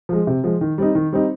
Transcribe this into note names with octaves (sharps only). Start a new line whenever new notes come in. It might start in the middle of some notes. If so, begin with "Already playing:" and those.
F3 G#3
C3
F3 G#3
D#3
G3 C4 D#4
D#3
G3 C4 D#4